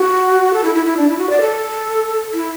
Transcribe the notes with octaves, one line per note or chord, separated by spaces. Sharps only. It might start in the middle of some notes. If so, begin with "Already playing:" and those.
Already playing: F#4
A4
E4
E4
E4
D4
E4
F#4
D5
A4
E4